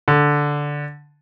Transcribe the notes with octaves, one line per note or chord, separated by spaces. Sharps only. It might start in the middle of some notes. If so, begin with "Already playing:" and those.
D3